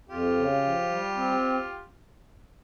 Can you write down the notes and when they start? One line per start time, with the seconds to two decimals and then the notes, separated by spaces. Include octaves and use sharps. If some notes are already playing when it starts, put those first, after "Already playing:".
0.09 F2 F4 G4
0.37 C#3
0.63 F3
0.89 G3
1.15 C4